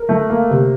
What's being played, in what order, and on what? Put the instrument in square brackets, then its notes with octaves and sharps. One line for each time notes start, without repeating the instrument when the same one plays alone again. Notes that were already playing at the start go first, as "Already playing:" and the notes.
Already playing: [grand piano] A#4
A3
A#3
C3